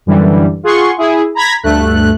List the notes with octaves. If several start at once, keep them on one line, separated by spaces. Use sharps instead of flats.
F#2 D3 E3 G3
F4 G#4 F#5 C6 C#6
E4 G#4
A#5 B5 G#6 A#6 B6
D2 G2 A3 F#6